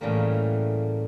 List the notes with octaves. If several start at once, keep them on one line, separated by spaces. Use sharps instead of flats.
A2 C#3 E3 G3 A#3